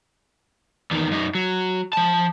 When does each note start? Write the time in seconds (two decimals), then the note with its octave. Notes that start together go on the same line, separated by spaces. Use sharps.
0.91 E2 D#3
1.11 F#2 D#4
1.35 F#3
1.93 F3 A5